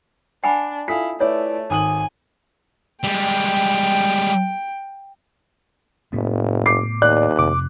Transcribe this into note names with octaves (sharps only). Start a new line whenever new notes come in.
D4 F#5 G#5 B5
E4 F4 A4 F5 G#5 B6
A3 E4 B4 C#5 D5
G#1 G#5 D#6 F#7
G3 G#3 G5
F#1 A2 B3
D6 C7
D#2 D5 F#6
F2 C3 D6